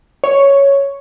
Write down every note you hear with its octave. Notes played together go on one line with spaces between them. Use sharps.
C#5